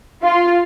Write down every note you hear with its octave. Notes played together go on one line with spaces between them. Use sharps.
F4